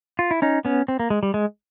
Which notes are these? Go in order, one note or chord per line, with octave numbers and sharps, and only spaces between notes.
F4
E4
C#4 D#4
B3 C#4
C4
A#3
G#3
G3
G#3